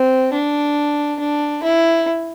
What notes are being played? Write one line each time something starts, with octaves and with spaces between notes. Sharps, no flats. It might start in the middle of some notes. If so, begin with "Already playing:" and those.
Already playing: C4
D4
D4
E4